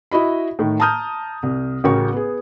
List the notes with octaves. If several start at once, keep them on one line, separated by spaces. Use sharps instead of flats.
E4 F#4 D#5 B5
A2 D#3
A5 A#5 D#6 F6 G6
C2
A1 C#3 F#4 A#4 G5 C#6
B3 G#4